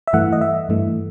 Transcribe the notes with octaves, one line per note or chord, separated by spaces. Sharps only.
E5
G2 E3 A3 F#5
D#5
E5
G2 E3 A3